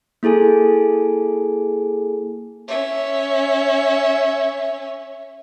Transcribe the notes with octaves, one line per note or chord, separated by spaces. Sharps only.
A#3 E4 G#4 A4 G#5
C#4 E5